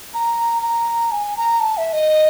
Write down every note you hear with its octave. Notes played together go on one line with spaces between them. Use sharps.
A#5
A#5
G#5
A#5
A5
E5
D#5